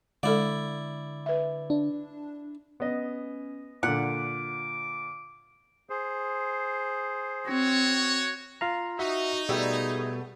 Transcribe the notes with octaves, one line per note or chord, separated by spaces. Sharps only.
D3 G#3 E4 A4 D5
B4 E5
D4
B3 C#4 D#5
A#2 D3 F#5 D6
G#4 C5
C4 F#4 C#5
F4 F5 A#5
D#4 F#4 E5 F#5
B2 G3 A3 B3 G#4